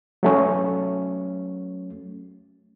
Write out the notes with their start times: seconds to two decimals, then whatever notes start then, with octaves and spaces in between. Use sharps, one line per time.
0.23 F#3 A3 C#4